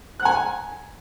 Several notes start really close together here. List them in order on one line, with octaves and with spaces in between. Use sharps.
F#6 F#5 G#5